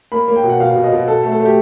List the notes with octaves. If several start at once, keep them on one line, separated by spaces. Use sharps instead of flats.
A#3 B5
A#3
G5
B2
F#5
B2 F5
B2
D#5
B2
B2 A4
A3
A4
A3
G4